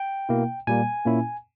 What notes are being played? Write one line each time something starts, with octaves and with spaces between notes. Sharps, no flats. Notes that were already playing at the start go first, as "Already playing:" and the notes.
Already playing: G5
B2 A#3 E4
A#2 G3 A#3 G#5
A#2 A#3 C#4 E4